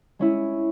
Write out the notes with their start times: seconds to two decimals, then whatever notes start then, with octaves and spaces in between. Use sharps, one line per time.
0.19 G#3 C#4 E4